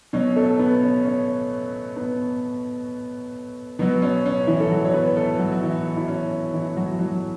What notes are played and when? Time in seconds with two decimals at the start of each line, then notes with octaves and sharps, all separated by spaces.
0.13 B2 F#3 C#4
0.36 A3 A4
0.59 B3
0.82 C#4
1.05 C#4
1.96 B3
3.79 B2 F#3 B3
4.02 C#4
4.26 C#4
4.47 E3 E4
4.60 A4
4.71 F#3 F#4
4.85 C#5
4.94 B3 B4
5.16 A3 A4
5.39 F#3 F#4
5.52 F#4
5.62 E3 E4
5.86 F#4
5.97 E4
6.08 C#4
6.54 E3 E4
6.77 F#3 F#4
6.99 F#3 F#4